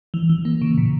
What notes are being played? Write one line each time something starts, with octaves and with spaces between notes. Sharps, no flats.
E3
E3
A#3
C#3
A#2